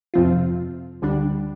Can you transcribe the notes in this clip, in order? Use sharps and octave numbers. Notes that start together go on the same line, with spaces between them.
F2 C3 F3 C4 F4
D2 D3 G3 D4